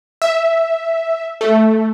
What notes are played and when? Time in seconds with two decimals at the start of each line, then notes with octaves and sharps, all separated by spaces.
0.22 E5
1.41 A3